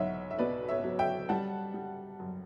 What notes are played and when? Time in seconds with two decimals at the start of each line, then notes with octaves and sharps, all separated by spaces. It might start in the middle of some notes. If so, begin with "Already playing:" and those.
Already playing: B1 C#5 E5 F#5
0.31 E5
0.38 B2 B4 D5
0.69 C#5 E5
0.84 F#3
0.99 E5 G5
1.29 G3 F#5 A5
1.74 G3
2.20 F#2